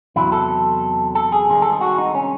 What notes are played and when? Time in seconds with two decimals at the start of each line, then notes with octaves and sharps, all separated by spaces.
0.16 E2 C3 F#3 E4
0.32 A4
1.15 A4
1.32 G#4
1.48 C2 C3 D#3 G#3
1.62 A4
1.72 G#4
1.81 F#4
1.98 D#4
2.15 C#4